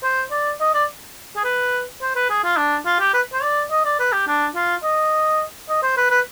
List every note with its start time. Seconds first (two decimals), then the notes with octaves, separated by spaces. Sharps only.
0.03 C5
0.31 D5
0.60 D#5
0.74 D5
1.36 G#4
1.44 B4
2.02 C5
2.16 B4
2.30 G#4
2.44 F4
2.57 D4
2.85 F4
3.00 G4
3.14 B4
3.33 C5
3.43 D5
3.71 D#5
3.85 D5
3.99 B4
4.13 G4
4.27 D4
4.56 F4
4.83 D#5
5.69 D#5
5.83 C5
5.97 B4
6.11 B4